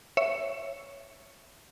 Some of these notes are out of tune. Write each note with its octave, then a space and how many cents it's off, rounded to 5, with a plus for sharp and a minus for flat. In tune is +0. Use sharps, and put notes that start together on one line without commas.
C#5 +0 E5 +10